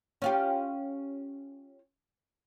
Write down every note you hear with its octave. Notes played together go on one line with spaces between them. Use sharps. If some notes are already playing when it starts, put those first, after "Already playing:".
C#4 F4 G4